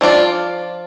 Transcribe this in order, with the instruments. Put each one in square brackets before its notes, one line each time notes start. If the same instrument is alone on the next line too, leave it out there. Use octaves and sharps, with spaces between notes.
[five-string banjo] F3 D4 F4 D5